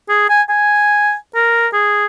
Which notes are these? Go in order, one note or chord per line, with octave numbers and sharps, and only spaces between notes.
G#4
G#5
G#5
A#4
G#4